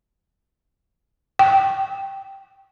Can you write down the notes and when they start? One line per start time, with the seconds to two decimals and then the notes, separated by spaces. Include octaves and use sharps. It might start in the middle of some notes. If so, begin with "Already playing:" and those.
1.39 G5